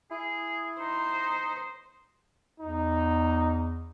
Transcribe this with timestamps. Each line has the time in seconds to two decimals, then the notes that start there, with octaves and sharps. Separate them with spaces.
0.11 E4 G#4
0.80 D#4 C5
2.60 E2 D#4